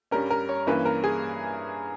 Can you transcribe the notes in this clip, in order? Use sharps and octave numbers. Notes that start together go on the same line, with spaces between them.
G2 G3 C#4 A#4
A#4
C#5
G2 E3 A#3 C#4 B4
A#4
G#4